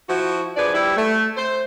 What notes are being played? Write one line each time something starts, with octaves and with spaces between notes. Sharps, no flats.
F3 E4 F#4
F3 D4 G#4 B4 D5
G3 E4
A3
C5